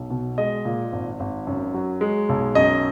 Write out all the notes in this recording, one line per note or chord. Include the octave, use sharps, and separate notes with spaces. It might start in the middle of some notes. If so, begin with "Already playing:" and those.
Already playing: B1
B2
G#3 D#5
A#2
G#1
G#1
F#2
F#3
G#3
B1
F#2 D#5